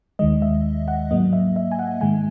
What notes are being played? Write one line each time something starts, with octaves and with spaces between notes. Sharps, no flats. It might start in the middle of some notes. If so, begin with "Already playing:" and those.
D#2 D#3 G#3 D#5
E5
F#5
G#2 F#3 A#3 D#5
E5
E5
G#5
F#5
G#2 D#3 G#3 G#5